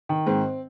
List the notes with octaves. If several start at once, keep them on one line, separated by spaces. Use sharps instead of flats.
D#3
G#2 C4